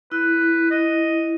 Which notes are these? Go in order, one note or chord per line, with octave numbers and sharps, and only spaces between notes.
E4 B4
E4
D#5